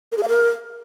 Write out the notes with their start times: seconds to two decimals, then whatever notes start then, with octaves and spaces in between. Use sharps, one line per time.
0.12 A#4
0.17 G#4
0.23 F5
0.28 A#4